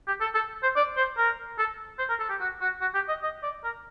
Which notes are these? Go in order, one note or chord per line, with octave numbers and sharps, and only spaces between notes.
G4
A4
A4
C5
D5
C5
A#4
A4
C5
A#4
A4
G4
F#4
F#4
F#4
G4
D#5
D#5
D5
A#4